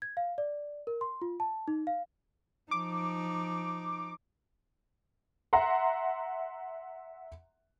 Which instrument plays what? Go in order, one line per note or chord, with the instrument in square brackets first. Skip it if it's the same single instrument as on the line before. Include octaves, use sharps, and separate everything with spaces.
[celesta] G#6
F5
D5
A#4
C6
F4
A5
D#4
F5
[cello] F3 D#4 [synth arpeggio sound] D6
[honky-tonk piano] E5 F#5 A#5 C6